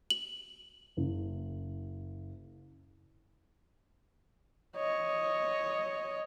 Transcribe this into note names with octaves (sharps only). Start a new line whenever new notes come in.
F#7
F#1
C#5 D#5